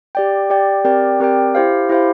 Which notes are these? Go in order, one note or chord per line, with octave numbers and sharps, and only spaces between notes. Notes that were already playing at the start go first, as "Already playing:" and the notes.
G4 D5 G5
G4 D5 G5
C4 G4 A#4 D5 G5
C4 G4 A#4 D5 G5
E4 G4 C5 F5
E4 G4 C5 F5